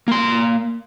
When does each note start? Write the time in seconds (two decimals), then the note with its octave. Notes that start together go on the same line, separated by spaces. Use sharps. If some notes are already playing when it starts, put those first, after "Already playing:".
0.08 A#3 C6